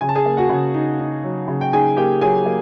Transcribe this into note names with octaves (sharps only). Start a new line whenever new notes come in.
C#3 G#5
A5
G#4 G#5
A#3
F#4 F#5
C#3
D#4
D#4
F#3
C#3
G5
D#4 G#4 G#5
A#3 G4 G5
F#3 G#4 G#5
A#3